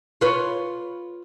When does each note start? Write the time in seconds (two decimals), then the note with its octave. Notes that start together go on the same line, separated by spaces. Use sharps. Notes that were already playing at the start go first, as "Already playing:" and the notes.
0.21 F4 B4 C#5